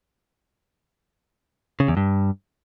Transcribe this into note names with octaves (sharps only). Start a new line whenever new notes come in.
C#3
E2
G2